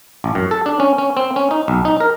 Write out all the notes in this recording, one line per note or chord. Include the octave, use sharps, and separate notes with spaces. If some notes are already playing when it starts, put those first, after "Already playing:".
A1
F#2
A4
D4
C#4
C#4
C4
C#4
D#4
B1
D#4
A#4